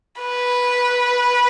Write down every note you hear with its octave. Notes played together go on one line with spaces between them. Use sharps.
B4